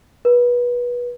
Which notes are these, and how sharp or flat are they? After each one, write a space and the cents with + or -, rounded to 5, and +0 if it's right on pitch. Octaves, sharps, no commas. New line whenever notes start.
B4 -25